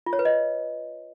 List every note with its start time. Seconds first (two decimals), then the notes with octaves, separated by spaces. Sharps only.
0.06 F4
0.13 C#5
0.19 B4
0.25 D#5